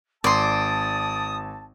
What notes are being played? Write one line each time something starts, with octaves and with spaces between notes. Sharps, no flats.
G#1 D5 A5 C6 D#6